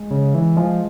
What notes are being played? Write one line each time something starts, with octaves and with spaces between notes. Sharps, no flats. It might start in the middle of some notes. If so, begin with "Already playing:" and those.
Already playing: G#3
C#3
E3
F3 G#3